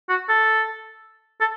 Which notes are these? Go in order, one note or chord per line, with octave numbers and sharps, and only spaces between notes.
F#4
A4
A4